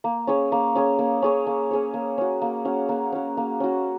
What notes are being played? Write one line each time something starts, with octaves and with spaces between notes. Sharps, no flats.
A#3
C#4 G#4 C#5
A#3
C#4 G#4 C#5
A#3
C#4 G#4 C#5
A#3
C#4 G#4 C#5
A#3
C#4 F#4
A#3
C#4 F#4
A#3
C#4 F#4
A#3
C#4 F#4